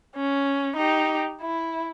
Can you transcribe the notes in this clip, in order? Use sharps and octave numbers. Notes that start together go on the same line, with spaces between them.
C#4
D#4 G4
E4